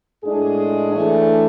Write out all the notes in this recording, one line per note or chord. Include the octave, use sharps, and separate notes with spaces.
A2 G#3 D4 G#4
A2 E3 A3 D4